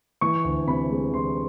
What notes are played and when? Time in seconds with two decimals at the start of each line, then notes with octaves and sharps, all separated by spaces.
0.21 E3 C#6
0.44 D2
0.67 C3 B5
0.90 G#3
1.13 E3 C6